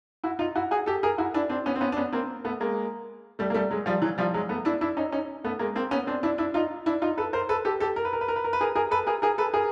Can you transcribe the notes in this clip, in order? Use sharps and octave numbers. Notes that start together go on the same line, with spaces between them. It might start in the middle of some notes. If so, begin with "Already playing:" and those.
E4 F#4
D#4 F4
E4 F#4
F#4 G#4
G4 A4
G#4 A#4
E4 F#4
D4 E4
C4 D4
B3 C#4
C4
B3 C#4
D4
B3 C#4
A#3 C4
A3 B3
G#3 A#3
G3 A3
A#3
G3 A3
F#3 G#3
F3 G3
E3 F#3
F3 G3
F#3 G#3
A3 B3
D4 E4
D4 E4
C#4 D#4
C#4 D#4
A3 B3
G#3 A#3
A#3 C4
B3 C#4
C4 D4
D4 E4
D4 E4
D#4 F4
D4 E4
D#4 F4
A4 B4
A#4 C5
A4 B4
G4 A4
G4 A4
A#4
B4
A#4
B4
A#4
B4
A#4
B4
G#4 A#4
G#4 A#4
A4 B4
G#4 A#4
G#4 A#4
A4 B4
G#4 A#4